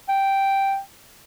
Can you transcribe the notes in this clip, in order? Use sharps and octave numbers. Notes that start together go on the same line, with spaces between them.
G5